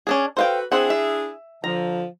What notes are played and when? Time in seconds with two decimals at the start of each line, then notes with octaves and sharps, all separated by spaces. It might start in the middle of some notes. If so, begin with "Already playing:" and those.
0.07 C#4 D4 G#4
0.37 F#4 A4 B4 C5 F5 G5
0.72 C4 D4 E4 G#4 F#5
0.90 E5
1.64 D3 F3 A#5